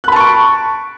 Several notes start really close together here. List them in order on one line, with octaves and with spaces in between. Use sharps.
F#6 B5 A5 C#6 D7